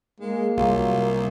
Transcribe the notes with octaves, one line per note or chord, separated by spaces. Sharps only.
G#3 A#3
C2 F#3 F4
A#3